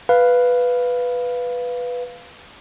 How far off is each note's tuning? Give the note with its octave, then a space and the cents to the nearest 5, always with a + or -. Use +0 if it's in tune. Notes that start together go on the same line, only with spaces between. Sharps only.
B4 +0 F5 +0